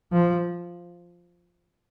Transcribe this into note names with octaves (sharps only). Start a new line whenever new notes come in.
F3